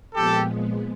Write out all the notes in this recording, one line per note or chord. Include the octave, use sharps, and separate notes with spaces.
A#2 F3 G#3 B3 G4 A4